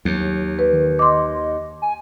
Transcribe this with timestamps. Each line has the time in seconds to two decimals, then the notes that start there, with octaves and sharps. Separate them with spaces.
0.05 D#2 F#3
0.59 B4
0.72 D#3
0.99 D#5 C6 D6
1.82 G#5